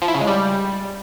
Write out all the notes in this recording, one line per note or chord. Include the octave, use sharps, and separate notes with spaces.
F3
E4
C#3
G#3
G3